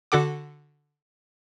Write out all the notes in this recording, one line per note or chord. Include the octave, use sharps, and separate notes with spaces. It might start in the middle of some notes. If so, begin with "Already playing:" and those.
D3 F#4 A4 F#5 D6